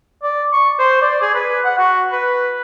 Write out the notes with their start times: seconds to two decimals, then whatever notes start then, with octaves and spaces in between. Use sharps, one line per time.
0.23 D5
0.53 C#6
0.79 C5
1.01 D5
1.21 G#4
1.35 B4
1.64 F#5
1.78 F#4
2.12 B4